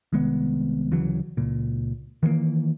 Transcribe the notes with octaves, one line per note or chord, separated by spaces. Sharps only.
C2 D#3 G#3 B3
D2 C#3 E3 F#3
C#2 A#2
D#3 E3 G3 A#3